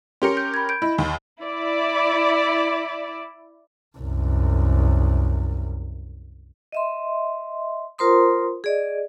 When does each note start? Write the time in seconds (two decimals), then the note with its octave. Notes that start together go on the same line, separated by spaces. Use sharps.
0.22 C#4 G4 A#4 C6 C#7
0.37 G6
0.54 B5 G#6
0.69 G6 D7
0.82 E4 D#5 B5
0.98 D#2
1.41 E4 D5
3.98 C2 F#2
6.72 D#5 E5 C6
7.99 F4 A#4 C5 A#5 C6 D#6
8.64 G#4 D5 D#5